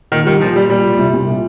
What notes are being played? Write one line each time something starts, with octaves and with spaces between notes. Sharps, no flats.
A#2 D#3
D#3 G3
A#2 F3
A#2 G3
A#2 G3
A#2
C2
C2
A#2